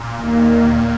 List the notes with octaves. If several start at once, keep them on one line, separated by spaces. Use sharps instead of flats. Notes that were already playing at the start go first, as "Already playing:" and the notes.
Already playing: A#2
D#2 D#3 A#3